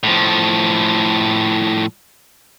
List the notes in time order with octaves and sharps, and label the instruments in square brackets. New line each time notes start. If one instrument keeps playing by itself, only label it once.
[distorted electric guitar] A2 F3